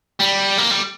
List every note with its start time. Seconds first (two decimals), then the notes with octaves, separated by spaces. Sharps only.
0.20 G3
0.58 A#3
0.71 G3